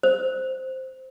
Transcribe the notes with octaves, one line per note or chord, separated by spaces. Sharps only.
C5